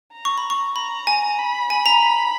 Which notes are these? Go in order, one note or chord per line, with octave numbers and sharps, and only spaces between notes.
A#5
C#6
B5
C#6
A#5 B5
G#5
B5
G#5 B5
A#5